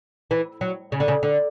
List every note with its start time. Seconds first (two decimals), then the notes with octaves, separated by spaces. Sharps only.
0.31 E3
0.61 F#3
0.92 C#3
1.00 D3
1.08 C#3
1.23 D3